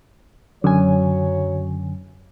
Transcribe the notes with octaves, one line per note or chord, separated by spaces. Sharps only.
F#2 D3 F#3 C#5 G#5